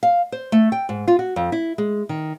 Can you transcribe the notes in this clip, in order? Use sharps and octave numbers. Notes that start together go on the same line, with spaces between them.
F5
C5
A3
G5
G#2
F4
F#4
F2
E4
G#3
D#3